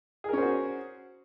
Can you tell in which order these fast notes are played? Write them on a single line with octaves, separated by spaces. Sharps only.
G#4 A#4 C#4 C5 F#4